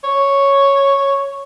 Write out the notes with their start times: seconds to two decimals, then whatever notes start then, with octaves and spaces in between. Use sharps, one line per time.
0.04 C#5